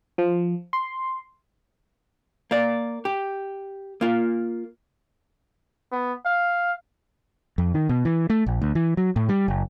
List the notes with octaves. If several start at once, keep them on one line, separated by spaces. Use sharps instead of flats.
F3
C6
A#3 D5
G4
A#3 F4
B3
F5
F2
D#3
B2
E3
A3
A#1
D2
E3
F#3
A2
G3
F#1